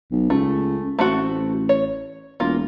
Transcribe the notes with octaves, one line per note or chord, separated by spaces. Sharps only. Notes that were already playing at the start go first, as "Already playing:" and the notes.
B1
C#2 A3
A1 A3 C4 F#4
C#5
E1 A#3 F4